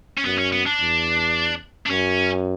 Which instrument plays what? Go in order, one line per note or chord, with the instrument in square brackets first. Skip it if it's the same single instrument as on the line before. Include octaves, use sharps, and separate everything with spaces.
[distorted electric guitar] C#4
[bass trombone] F#2 [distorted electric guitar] B3
[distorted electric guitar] C#4
B3
D4
[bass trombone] E2
[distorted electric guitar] D4
[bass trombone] F#2 [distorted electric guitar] C#4